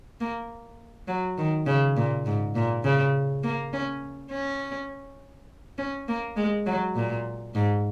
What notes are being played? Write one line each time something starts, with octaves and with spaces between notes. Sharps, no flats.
A#3
F#3
D#3
C#3
A#2
G#2
A#2
C#3
A#3
C#4
C#4
C#4
A#3
G#3
F#3
A#2
G#2